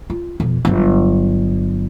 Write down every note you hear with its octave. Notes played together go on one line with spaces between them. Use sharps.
F4
F2 B2
G1 F#3